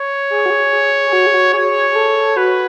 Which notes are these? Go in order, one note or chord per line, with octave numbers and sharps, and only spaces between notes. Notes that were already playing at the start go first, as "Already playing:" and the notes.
Already playing: C#5
G#4
F#4
G#4
G#4
G#4
F#4
G#4
F#4
G#4 C#5
G#4
A4
F#4 B4